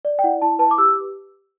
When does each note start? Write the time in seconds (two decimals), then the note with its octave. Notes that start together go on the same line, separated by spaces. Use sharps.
0.05 D5
0.19 G5
0.24 E4 F#5
0.42 E4 A5
0.59 B4 A5
0.71 D6
0.78 G4 E6